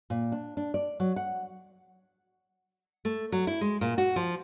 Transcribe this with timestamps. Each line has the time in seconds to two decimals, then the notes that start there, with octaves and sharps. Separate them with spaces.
0.10 A#2
0.32 D4
0.57 D4
0.74 D5
1.00 F#3
1.16 F#5
3.05 A3
3.32 F#3
3.47 E4
3.61 G#3
3.81 A#2
3.98 F#4
4.16 F3